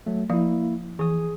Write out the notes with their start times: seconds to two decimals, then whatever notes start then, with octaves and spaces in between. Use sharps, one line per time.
0.06 F#3 A3
0.30 F3 A#3 E4 F5
0.99 E3 G#4 D#6